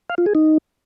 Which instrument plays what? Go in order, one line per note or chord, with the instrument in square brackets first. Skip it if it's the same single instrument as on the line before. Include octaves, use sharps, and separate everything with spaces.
[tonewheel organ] F5
F4
G#4
D#4